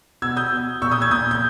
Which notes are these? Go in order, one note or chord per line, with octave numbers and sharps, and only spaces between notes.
B2 E6 G#6
D#6 G6
B2
A#2 C#6 E6
D#6 G6
E6 G#6
A#2 D#6 G6
G6